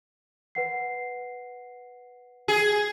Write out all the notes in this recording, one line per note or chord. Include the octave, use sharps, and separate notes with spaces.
B4 F#5 C7
G#4